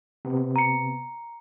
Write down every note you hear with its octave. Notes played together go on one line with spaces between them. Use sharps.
C3 B3
A#5 C#7